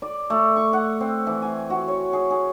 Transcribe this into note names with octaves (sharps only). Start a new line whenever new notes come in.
D5
A3
C#6
F#5
C4
E3
G#5
F#4
C#5
G#4
G#4